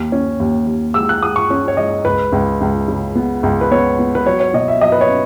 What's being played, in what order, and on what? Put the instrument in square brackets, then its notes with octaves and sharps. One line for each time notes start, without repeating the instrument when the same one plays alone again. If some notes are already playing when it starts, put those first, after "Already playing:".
Already playing: [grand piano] D#2
C#4
D#2
D#2
G#3 E6
F#6
G#3 D#6
C#6
C#4
C#5
G#3 D#5
C#2 B4
C#2
C#2
C#3
B3
C#2
B4
B3 C#5
B3
B4
F#3 C#5
C#5
B2 D#5
E5
F#3 D#5
B4
C#5
C#4